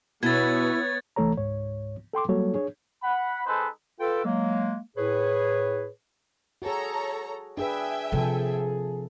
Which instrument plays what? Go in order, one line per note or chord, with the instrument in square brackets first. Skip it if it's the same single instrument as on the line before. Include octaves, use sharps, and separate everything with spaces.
[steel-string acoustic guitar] B2 [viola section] B3 B4 C#5 [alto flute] E4 [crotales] G#6 A6
[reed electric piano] C2 E3 A3 A4 C#5 A#5
C#2 G#2 C#5
A4 G5 C6 D6
F#3 G3 A#3 F#4 A4 C#5
D4 G#4 C#5
[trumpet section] F#5 B5
G#3 D#4 A4 B4 C5
[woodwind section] F4 A4 B4 G5
F#3 G#3 A#3
A2 G#4 B4 C#5
[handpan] F#4 G#4 [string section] A4 C#5 A#5
[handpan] D4 G#4 B4 [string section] E5 G5 G#5
[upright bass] C3 [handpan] F3 A4 [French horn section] G#4